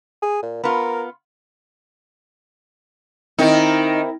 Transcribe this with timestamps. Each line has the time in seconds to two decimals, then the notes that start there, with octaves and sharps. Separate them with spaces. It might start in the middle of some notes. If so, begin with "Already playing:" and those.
0.22 G#4
0.43 A#2
0.64 B3 F4 A#4
3.39 D#3 C4 D#4 E4 A#4